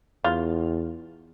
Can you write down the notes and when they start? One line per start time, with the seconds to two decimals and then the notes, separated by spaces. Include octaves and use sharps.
0.24 E2 F4